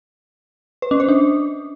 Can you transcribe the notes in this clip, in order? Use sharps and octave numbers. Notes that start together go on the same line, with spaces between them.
B4
C#4
C5
D4